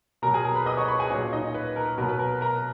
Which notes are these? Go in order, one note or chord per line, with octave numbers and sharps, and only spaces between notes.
B2 F#3 A#4 A#5
G#4 G#5
A#4 A#5
B4 B5
D#5 D#6
C#5 C#6
B4 B5
G#4 G#5
A#2 F#3 C#4 C#5
D#4 D#5
B4
A#4
B2 F#3 A#4
B4
A#4
A#4 A#5